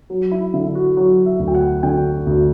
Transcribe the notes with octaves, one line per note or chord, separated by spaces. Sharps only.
F#3 F#4
E4
D3 E4
F#4
F#3 F#4
E5
D2
G5
F#5
D3 G5
D2